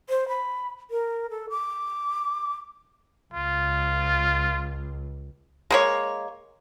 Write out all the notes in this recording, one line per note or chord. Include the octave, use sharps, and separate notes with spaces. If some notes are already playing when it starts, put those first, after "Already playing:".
C5
B5
A#4
A4
D6
C#2 F4
G#3 A#3 C#5